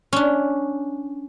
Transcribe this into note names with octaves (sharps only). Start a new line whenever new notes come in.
C#4 D4